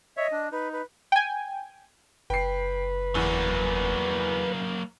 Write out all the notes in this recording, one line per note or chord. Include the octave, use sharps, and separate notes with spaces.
C#5 D#5 E5
D4
D#4 B4
B4
G5 G#5
F#1 B4 G5 C7
E2 F#3 A#3